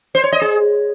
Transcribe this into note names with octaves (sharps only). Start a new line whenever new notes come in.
C5
C#5
D#5
G#4